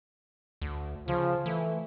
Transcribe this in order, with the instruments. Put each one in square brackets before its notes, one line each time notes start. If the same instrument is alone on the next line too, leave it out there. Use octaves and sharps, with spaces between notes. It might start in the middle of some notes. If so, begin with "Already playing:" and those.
[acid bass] D2
[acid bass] C#3 [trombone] F3
[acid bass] E3 [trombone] A3